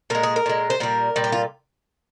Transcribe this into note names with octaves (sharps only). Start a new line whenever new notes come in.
A#2 G#3 A#4
G#4
A#4
A#2 G#3
C5
A#2 G3 A#4
A#2 G3
G4
F4